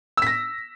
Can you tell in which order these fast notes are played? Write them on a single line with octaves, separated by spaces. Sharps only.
E6 B6 A#6